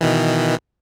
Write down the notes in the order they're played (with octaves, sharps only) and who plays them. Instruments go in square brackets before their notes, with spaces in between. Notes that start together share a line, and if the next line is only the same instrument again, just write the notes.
[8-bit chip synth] B2 D#3 E3